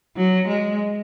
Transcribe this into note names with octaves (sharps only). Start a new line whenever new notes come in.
F#3
G#3